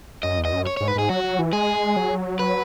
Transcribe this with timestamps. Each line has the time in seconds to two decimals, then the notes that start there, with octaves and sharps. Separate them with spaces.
0.23 F#2 D#5
0.38 E2
0.45 D#5
0.52 F#2
0.67 C#5
0.77 G#2 C#5
0.88 B4
0.95 G#2 G#4
1.09 F#3 F#4
1.24 F#3
1.39 E3
1.53 G#3 G#4
1.96 F#3
2.39 B4